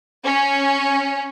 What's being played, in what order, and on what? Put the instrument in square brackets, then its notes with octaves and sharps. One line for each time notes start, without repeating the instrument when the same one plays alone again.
[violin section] C#4